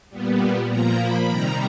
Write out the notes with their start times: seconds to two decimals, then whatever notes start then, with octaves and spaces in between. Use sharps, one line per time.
0.10 A#2 G3 B3
0.69 A#2 F3 A#3 A#5
0.98 B5
1.28 C3 D#3 G3 A#5